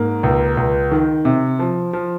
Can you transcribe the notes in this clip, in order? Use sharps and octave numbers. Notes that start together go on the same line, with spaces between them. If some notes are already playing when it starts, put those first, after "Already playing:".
Already playing: G#2 A#3
C#2
C#2
D#3
C3
F3
F3